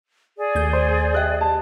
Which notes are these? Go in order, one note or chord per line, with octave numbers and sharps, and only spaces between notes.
G#4 D5
D#2 A3 G6
C5
G4 D#5 E5 G5 F#6
A5